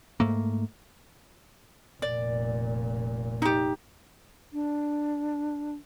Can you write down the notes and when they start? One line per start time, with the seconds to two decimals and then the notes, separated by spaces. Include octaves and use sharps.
0.20 G#2 A3 A#3
2.02 F1 A#2 D5
3.42 D#4 G4
4.53 D4